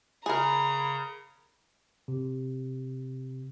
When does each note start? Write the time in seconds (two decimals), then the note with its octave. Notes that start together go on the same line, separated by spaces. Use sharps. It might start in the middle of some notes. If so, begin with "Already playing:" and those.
0.26 C#3 G#4 A#4 A#5 B5
2.08 C3